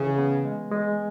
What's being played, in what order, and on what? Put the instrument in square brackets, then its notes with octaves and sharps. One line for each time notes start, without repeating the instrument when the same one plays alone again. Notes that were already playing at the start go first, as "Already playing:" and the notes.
Already playing: [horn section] C#3 [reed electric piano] E3
[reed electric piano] B3
G#3
G#3